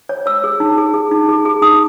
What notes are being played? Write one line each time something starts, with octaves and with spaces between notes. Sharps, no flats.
C#5
C#5 E6
G#4
D#4
G#4
G#4
D#4
G#4
G#4
D#4 D#6